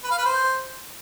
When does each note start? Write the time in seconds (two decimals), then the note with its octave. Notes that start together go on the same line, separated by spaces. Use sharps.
0.04 B4
0.11 F5
0.18 B4
0.25 C5